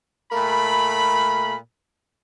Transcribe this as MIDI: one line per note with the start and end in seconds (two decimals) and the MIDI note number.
0.32 1.55 46
0.32 1.55 57
0.32 1.55 70
0.32 1.55 83